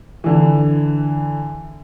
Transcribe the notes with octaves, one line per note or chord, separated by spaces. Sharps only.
D3 E3